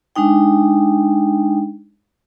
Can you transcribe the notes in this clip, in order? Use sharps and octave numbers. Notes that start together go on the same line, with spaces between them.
G#3 D4 D#4 G5